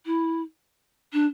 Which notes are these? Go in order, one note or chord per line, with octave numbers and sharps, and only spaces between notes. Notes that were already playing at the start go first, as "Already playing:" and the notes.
E4
D4